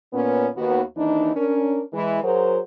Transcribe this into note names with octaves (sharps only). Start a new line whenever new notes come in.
A#2 B3 C#4
D#2 B3 F#4
D#2 E3 D4 D#4
C#4 D4 A#4
E3 G#3
F#3 F#4 G#4 A#4 C5